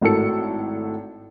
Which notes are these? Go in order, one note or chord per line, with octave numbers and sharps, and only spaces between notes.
G#1 A2 F#4 A4 C#7